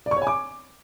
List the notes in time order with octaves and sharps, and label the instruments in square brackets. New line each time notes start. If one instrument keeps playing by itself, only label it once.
[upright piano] D5
C#6
C#5
G#5
D6